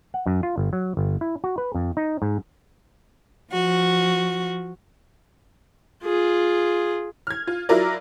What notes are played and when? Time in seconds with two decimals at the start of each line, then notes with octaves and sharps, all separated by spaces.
0.14 F#5
0.26 F#2
0.43 F4
0.58 G1
0.73 F#3
0.97 G1
1.21 E4
1.44 F#4
1.58 B4
1.74 F2
1.97 D#4
2.22 G#2
3.53 F3 F#4
6.03 F4 G#4
7.27 F6 G#6
7.47 F4
7.69 F#3 E4 F4 A#4 D5